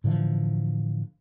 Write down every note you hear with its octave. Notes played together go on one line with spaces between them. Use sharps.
A2 D3 E3 F3